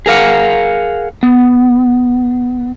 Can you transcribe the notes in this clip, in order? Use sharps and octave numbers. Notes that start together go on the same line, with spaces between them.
G#4 A#4 F5 F#5
B3